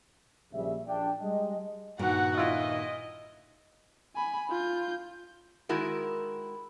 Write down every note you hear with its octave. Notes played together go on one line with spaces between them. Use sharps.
A#1 C#3 G3 E5
A#1 D4 G5
G3 G#3 D#5
G2 A#2 D#3 F#4 F#5
E4 F4 D#5
G#5 B5
F4 G6
D#3 G#3 E4 F#4 A#4